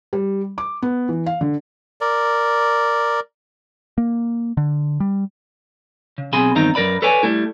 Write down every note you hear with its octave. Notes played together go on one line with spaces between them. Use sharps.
G3
D6
B3
E3
F5
D3
A#4 D5
A#3
D3
G3
C#3
B1 C4 G#4 G#5 B5 C6
E2 G2 D#3 C4 D#4 A#5
F#2 B2 A#4 B4 D5 B5
A4 B4 C#5 D5 G#5
G3 A3 E4